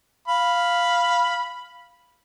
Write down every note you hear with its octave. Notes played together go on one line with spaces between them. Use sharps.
F5 B5